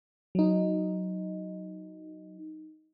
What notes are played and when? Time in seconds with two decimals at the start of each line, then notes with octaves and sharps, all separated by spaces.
0.35 F#3 D#4